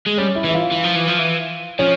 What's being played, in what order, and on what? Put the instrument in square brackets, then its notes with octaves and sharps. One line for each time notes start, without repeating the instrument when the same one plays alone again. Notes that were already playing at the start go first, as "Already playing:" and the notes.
[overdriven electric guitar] G#3
[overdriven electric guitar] G3 [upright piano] C#4
[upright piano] E4
[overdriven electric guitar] E3
[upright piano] E4
F4
[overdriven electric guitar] E3
F3
E3
F3
E3
[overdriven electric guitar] F3 [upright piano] C#4